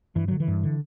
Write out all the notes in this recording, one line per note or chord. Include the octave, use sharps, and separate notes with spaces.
G2 E3
D3 F#3
E3
G2
D3